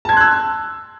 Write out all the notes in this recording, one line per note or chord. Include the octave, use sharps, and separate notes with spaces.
A5 C6 E6 F#6 G#6